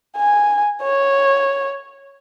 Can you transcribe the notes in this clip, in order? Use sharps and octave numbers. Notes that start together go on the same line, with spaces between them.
G#5
C#5